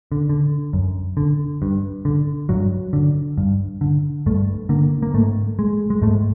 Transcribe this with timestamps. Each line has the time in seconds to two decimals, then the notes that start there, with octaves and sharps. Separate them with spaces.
0.12 D3
0.29 D3
0.73 F#2
1.17 D3
1.62 G2
2.05 D3
2.49 G2 F#3
2.93 D3
3.38 G2
3.81 D3
4.26 G2 A3
4.69 D3 A#3
5.02 A#3
5.14 G#2 A3
5.59 G#3
5.90 G#3
6.02 G#2 A3